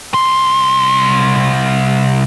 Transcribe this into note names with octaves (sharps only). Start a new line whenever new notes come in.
C2 C6